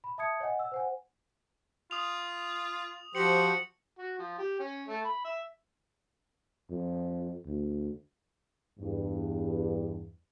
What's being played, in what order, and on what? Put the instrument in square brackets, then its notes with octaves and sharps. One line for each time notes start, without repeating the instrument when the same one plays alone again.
[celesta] B5
E5 A5 D#6 G#6 C#7
C#5 D#5 F#5 G#5
E6
C5 F#5 G#5
[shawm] F4 [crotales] D#6 F7
[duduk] F3 [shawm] F#4 [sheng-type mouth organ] G4 C5 [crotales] C#7 F#7
[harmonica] F#4
F3
G4
C#4
A3
B5
E5
[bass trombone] F2
D2
[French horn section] E2 G2